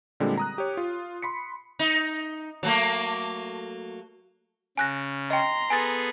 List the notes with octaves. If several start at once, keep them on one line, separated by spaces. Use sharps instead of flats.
A#2 D3 G3 G#3 C4
A#5 D#6 F#6
G4 C#5
F4
B5 C6 B6 C#7
D#4
F#3 A3 A#3
C#3 G#5 F#6 A#6
D#5 G5 A#5 C6
B3 G#4 A4 G#5 A6